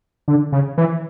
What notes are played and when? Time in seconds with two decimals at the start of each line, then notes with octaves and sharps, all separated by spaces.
0.28 D3
0.52 C#3
0.78 E3